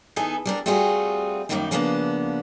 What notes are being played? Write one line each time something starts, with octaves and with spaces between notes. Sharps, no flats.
E3 B3 D#4 G#4 A4
G3 D4 A#4
G3 A3 C4 F4 F#4 G#4
F#2 A2 D#3 G3 A#3 D#4
C#3 F3 G3 A#3 B3 D4